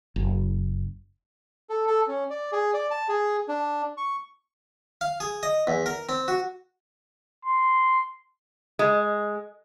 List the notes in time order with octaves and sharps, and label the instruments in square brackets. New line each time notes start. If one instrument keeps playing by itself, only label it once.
[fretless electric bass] F#1
[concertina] A4
A4
C#4
D5
G#4
D5
A5
G#4
D4
C#6
[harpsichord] F5
G#4
D#5
E2
A#4
C4
F#4
[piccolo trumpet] C6
[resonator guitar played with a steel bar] G#3